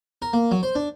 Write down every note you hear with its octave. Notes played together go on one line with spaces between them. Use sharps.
A#4
A#3
F#3
C5
D4